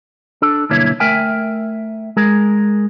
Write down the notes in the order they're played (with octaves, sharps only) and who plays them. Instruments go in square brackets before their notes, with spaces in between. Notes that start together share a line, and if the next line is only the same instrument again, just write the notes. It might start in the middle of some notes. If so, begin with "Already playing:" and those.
[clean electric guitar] D4 A4
B1 G2 D3 A#3 E4 C#5
A3 A#4 E5 G5 G#5
G#3 G#4 A#4